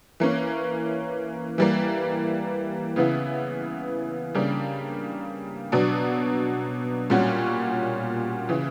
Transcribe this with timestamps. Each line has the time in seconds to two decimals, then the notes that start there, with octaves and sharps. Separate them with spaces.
0.20 E3 A#3 C#4
1.58 E3 G3 A#3
2.96 C#3 E3 B3 E4
4.35 C#3 G3 A#3 D4
5.72 B2 F#3 B3 D4
7.10 A#2 G3 C#4 F#4
8.49 C#3 E3